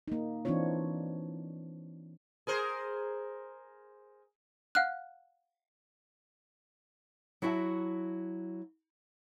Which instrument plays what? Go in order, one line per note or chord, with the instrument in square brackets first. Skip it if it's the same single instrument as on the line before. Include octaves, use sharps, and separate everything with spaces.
[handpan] A#3 D#4
E3 C4 D4 D#4 F4 C#5
[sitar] G#4 A#4 C5
[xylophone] F5 F#5 F6 F#6
[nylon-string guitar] F#3 E4 F#4 E5 F#5 A5